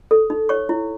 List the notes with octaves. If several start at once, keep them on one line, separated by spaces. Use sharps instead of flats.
A4
D#4
C#5 C#6
E4